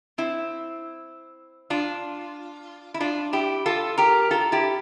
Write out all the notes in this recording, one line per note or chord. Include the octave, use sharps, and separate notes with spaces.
C4 E4
D4 F4
E4
D4 F4
E4 G4
F4 A4
G4 A#4
F4 A4
E4 G4